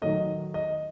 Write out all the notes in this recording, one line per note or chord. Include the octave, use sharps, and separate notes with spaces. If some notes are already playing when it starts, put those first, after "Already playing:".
D#3 F#3 A3 D#5
D#5